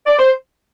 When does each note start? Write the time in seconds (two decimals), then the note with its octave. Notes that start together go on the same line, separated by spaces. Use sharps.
0.06 D5
0.18 C5